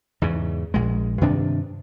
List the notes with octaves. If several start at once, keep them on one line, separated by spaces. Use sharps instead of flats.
E2 G#2 C#3
A#1 G#3
G2 C3 D#3 D4